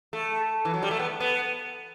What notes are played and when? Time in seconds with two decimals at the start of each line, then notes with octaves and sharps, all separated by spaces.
0.13 A3
0.65 E3
0.74 F#3
0.83 G3
0.91 A3
0.99 B3
1.20 B3